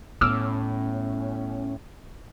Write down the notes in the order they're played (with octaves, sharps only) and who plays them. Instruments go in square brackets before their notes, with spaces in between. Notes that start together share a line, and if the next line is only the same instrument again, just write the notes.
[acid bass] A2 [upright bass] B3 [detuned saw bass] C#4 [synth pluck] D6 E6 F6